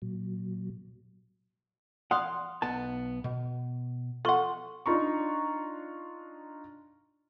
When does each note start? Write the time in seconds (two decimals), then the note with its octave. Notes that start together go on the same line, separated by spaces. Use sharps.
0.02 A#2 F#3
2.11 D5 F5 F#5 C6 D#6
2.62 B1 B3 A5
3.24 B2
4.25 F4 A4 F#5 C6 C#6
4.86 D4 D#4 F4 A#5 C#6